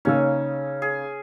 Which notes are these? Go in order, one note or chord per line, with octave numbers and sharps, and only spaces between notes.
C#3 A#3 C#4 D#4 A4
G#4